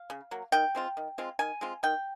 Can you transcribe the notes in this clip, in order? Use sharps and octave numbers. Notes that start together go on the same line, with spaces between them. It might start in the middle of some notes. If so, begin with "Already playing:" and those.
Already playing: F5
C#3
F#3 A#3
D#3 G5
G#3 C4 F4
D#3
G#3 C4 F4
D#3 G#5
G#3 C4 F4
D#3 G5